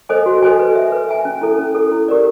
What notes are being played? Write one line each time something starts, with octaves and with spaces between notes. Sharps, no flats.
A4 C5 D#5 G#5
F#4
A4 C5 D#5 G#5
B4
E5 G#5
B4
E5 G#5
C#4
E4 A4
C#4
E4 A4
E4
G4 A#4 D5